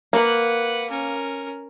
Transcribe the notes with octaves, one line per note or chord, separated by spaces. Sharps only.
A#3 B4 F#5
C#4 A#4